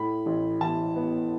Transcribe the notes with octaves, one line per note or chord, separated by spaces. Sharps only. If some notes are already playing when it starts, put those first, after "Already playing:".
Already playing: A2 B5
A1
E3 A5
B3